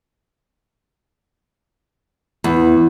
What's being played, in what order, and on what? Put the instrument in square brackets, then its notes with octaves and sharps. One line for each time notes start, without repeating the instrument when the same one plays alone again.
[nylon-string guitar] E2